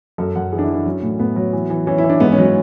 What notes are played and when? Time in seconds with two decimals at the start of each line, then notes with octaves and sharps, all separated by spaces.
0.18 F#2 A4
0.35 F#2 F#5
0.52 E3 G#4
0.59 D4
0.64 E3 E4
0.74 D4
0.86 F#3 C#4
1.02 A2
1.19 A2 B3
1.36 F#3
1.53 E3
1.70 E3
1.87 E3 C#4
1.98 E4
2.04 E3
2.10 D4
2.20 G#2 B3
2.32 C#4
2.38 F#3
2.44 B3